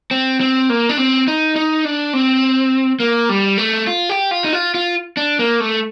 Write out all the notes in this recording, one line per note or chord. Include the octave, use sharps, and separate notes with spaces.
C4
C4
A#3
D4
C4
D#4
D#4
D4
C4
A#3
G3
A3
F4
G4
F4
D#4
F4
F4
D4
A#3
A3